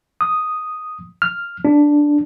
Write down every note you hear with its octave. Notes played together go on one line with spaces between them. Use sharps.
D#6
F6
D4